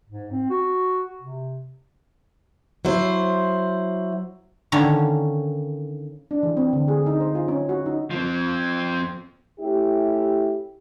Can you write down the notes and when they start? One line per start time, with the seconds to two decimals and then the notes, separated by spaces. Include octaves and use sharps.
0.09 G#2
0.31 C4
0.50 F#4
1.22 C3
2.85 F#3 E4 C5
4.72 D3 D#3 A#3 C#4 C#5
6.31 D4
6.43 E3
6.57 C4
6.73 D3
6.88 G#4
7.06 D#4
7.20 C5
7.35 F4
7.48 C#4
7.69 F#4
7.86 D#4
8.11 F3 C4
9.59 A3 C#4 E4 G4